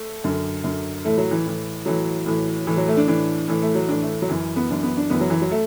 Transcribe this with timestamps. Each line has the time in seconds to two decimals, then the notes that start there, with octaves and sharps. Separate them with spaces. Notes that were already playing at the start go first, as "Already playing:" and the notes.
Already playing: A3
0.24 F#2 D3
0.64 F#2 D3
1.05 A2 E3 A3
1.18 F#3
1.31 E3
1.45 A2 E3
1.86 A2 E3 F#3
2.26 A2 E3
2.67 A2 E3
2.77 F#3
2.88 A3
2.97 D4
3.08 A2 E3 D4
3.48 A2 E3
3.62 A3
3.75 F#3
3.88 A2 E3 D4
4.02 A3
4.22 F#3
4.29 F#2 E3
4.56 B3
4.70 F#2 E3 D4
4.83 B3
4.97 D4
5.10 F#2 E3 B3
5.21 F#3
5.30 E3
5.41 F#3
5.51 A3